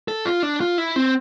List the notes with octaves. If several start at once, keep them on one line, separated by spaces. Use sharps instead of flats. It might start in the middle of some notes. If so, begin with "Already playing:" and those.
A4
F4
D4
F4
E4
C4